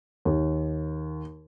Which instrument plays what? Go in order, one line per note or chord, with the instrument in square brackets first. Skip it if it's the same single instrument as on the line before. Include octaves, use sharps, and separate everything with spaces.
[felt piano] D#2